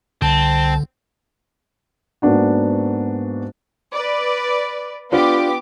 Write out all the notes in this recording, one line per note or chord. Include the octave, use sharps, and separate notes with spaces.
C2 D3 C4 A5
G#2 A#3 B3 D4 F#4
B4 D5
B3 D4 F4 G4 D6